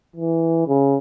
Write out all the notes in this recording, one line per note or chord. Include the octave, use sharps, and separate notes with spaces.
E3
C#3